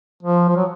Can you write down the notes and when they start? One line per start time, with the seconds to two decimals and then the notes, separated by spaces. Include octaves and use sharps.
0.23 F3
0.49 F3
0.56 F#3